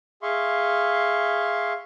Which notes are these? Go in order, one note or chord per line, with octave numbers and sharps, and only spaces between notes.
G#4 E5 F5 C6 C#6